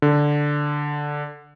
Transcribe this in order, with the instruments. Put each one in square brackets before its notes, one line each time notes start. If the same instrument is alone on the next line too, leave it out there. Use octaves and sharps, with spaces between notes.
[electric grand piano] D3